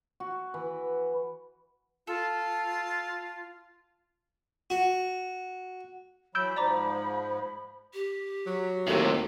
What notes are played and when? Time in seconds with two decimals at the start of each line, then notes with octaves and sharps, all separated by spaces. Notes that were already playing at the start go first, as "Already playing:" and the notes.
0.20 F#4
0.54 E3
2.07 F4 A4
4.70 F#4
6.35 E3 F#3 B5 E6 G6 D7
6.56 G#2 F3 D5 A#5 D6
7.94 G4
8.47 F#3
8.87 D#2 A2 C3 A4